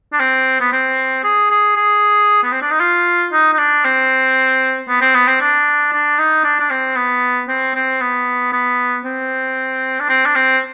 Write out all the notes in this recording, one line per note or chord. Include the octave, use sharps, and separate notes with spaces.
D4
C4
B3
C4
G#4
G#4
G#4
B3
C4
D4
D#4
F4
D#4
D#4
D4
C4
B3
C4
B3
C4
D4
D4
D#4
D4
D4
C4
B3
C4
C4
B3
B3
C4
D4
C4
D4
C4